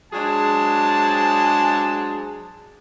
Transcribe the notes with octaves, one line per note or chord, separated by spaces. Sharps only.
F#3 G#3 D4 G#4 C5 A5